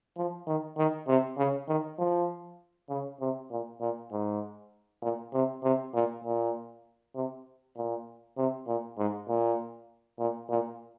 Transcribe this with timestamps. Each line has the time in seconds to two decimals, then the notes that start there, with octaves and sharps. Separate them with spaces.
0.16 F3
0.47 D#3
0.77 D#3
1.07 C3
1.37 C#3
1.68 D#3
1.99 F3
2.89 C#3
3.20 C3
3.51 A#2
3.80 A#2
4.11 G#2
5.02 A#2
5.33 C3
5.63 C3
5.94 A#2
6.24 A#2
7.15 C3
7.76 A#2
8.37 C3
8.67 A#2
8.98 G#2
9.28 A#2
10.19 A#2
10.49 A#2